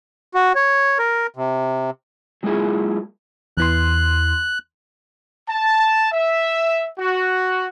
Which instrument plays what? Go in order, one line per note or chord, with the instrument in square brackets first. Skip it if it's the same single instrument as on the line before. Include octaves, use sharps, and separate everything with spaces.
[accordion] F#4
C#5
A#4
C3
[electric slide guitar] F#3 G#3 A#3 E4 F4 G#4
[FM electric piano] E2 E3 C6 [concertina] F#6
[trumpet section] A5
E5
F#4